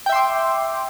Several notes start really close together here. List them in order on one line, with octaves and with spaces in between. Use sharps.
G5 E5 C6 D6